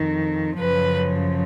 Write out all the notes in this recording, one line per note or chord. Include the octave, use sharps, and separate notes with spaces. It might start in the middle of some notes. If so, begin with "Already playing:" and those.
Already playing: F2 D#3
F#2 C#3 F3 B4